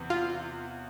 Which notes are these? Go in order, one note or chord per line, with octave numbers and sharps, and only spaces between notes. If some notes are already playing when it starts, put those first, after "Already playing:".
Already playing: E2 C3 E3
F4